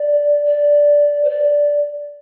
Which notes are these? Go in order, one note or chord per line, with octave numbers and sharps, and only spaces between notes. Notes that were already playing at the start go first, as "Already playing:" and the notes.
Already playing: D5
D5
C5
D5